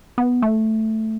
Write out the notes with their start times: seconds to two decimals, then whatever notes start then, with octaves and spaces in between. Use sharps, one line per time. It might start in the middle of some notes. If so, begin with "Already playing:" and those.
0.18 B3
0.42 A3